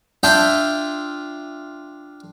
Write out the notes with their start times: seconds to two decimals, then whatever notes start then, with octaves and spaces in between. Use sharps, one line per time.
0.23 D4 F4 E5 G5